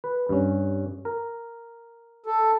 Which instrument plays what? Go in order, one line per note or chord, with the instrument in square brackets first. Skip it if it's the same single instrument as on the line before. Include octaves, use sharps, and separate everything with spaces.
[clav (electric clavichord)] B4
G2 C#4
A#4
[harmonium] A4